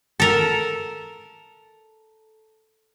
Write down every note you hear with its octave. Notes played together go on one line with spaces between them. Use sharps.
A4 A#4